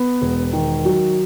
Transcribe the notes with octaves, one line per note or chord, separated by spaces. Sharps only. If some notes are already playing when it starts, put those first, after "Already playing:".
Already playing: B3
E1
D#3
F#3